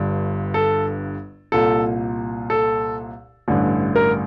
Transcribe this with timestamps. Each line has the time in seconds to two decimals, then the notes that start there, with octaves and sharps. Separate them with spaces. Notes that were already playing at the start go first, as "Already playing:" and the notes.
Already playing: G1 G2 D3
0.54 A4
1.52 C2 A#2 A4
2.50 A4
3.48 A1 G2 D3
3.96 A#4